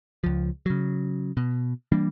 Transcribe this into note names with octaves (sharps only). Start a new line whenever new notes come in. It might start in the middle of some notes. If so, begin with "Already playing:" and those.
C#2 F3
C#3 F#3
B2
E3 G3 A#3 D4